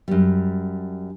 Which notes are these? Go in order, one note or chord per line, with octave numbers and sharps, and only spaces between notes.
F#2 G3